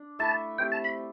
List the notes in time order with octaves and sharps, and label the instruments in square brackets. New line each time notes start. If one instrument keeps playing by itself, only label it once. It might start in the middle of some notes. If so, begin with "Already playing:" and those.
Already playing: [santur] D4
[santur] A3 E4 A4 E5 [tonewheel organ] A5
[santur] A3 C4 G4 C5 [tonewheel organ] G5
[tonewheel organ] A5
B5